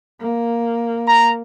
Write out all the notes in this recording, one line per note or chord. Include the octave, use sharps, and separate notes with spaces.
A#3
A#5